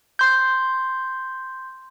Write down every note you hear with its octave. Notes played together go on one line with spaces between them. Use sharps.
C6 G6